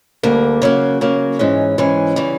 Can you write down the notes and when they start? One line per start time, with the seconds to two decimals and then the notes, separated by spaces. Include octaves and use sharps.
0.23 D2 D3 G3 A#3
0.62 C#3 F#3 A#3
1.01 C#3 F#3 A#3
1.39 G#2 E3 G#3 C#4
1.78 G#2 E3 G#3 C#4
2.16 C#3 E3 G3